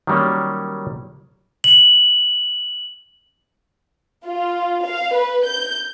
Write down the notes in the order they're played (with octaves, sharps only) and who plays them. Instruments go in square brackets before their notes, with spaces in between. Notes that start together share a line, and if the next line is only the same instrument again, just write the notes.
[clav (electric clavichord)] D#3 F#3 G3 A#3 C#4
[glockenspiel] F#7
[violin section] F4
F5
B4
G6